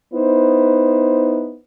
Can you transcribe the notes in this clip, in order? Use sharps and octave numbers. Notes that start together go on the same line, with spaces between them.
B3 D#4 E4 C5